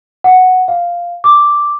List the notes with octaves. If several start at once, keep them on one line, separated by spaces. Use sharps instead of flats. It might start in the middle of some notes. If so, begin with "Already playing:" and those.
F#5
F5
D6